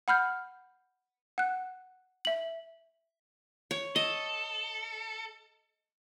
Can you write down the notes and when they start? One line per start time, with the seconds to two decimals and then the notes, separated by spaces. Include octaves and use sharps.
0.08 F#5 B5 F6 G6
1.38 F#5 F#6
2.25 E5 F#7
3.71 C#5
3.96 A4 D#5